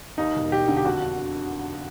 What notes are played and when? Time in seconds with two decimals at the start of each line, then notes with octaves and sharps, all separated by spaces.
0.18 D#2 D#4
0.36 E1
0.52 E1 G4
0.68 D3
0.77 G4
0.85 F2 F#4